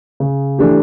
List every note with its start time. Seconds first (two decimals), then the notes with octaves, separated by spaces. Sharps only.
0.20 C#3
0.58 E3 A3 D4 G4